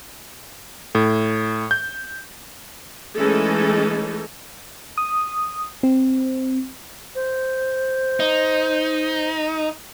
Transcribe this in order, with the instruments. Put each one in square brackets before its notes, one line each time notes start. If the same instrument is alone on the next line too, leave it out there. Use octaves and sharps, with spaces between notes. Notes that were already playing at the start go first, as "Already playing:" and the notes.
[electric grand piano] A2
G6
[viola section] E3 G#3 A3 C#4 D#4 A4
[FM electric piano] D#6
C4
[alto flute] C5
[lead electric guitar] D#4